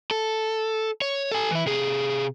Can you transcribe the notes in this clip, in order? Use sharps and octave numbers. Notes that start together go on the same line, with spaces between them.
A4
C#5
A4 G#5
E3 E4
C3 G#4